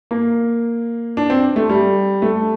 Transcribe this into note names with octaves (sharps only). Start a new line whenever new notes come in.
A#3
D4
C4
A3
G3
A3